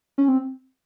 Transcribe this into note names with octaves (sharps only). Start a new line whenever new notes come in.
C#4
C4